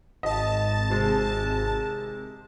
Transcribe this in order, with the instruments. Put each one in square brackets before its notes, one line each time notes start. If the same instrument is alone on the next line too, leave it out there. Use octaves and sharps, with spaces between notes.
[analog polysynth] G#1 A5 [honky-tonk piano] D#5
[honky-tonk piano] C3 G#3